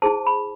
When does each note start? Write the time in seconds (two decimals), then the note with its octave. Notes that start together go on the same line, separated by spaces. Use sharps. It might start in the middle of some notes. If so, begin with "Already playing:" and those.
0.02 E4 G#4 C5 A5
0.26 B5